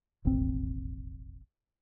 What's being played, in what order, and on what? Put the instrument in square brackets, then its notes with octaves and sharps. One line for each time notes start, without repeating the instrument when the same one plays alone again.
[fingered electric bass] E1 A1 D#2 C4